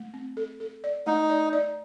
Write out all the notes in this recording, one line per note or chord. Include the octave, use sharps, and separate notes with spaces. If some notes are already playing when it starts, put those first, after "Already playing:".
Already playing: A3
C4
A4
A4
D5
A3 D#4
D5
D5